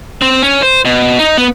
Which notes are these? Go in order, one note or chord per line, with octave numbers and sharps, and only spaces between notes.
C4
C#4
C5
B2
D#4
B3